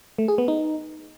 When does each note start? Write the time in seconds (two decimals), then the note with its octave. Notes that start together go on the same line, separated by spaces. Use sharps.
0.18 A3
0.28 G#4
0.38 B3
0.48 D#4